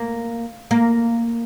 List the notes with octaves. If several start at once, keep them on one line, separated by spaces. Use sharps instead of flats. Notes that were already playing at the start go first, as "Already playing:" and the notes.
Already playing: A#3
A#3